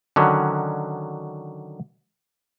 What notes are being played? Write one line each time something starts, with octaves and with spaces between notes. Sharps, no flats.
D3 D#3 F#3 C#4